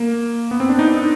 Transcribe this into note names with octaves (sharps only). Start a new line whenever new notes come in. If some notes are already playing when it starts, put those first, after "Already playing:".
Already playing: A#3
B3
C4
D4
D#4
D#4